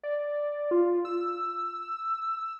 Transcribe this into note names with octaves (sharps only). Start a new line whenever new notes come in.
D5
F4
E6